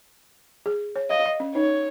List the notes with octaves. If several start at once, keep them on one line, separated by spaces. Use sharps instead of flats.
G#4
C#5
D#5 F5
D#5
C#4
D#4 C#5